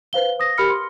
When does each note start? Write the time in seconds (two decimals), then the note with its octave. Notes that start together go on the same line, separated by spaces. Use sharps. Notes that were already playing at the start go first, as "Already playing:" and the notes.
0.13 B4 C5 F5 G7
0.40 D#6 A#6
0.58 G4 A#4 B5 F6 C#7
0.70 C6